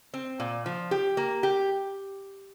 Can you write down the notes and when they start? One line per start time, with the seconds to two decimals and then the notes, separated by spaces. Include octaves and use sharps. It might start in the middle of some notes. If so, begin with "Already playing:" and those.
0.14 C4
0.40 A#2
0.66 F3
0.91 G4
1.17 A#3
1.43 G4